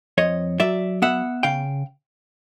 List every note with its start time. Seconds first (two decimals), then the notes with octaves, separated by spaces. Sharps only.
0.18 F2 C#5 D#5
0.60 F#3 D5 E5
1.02 B3 E5 F#5
1.43 C#3 F5 G5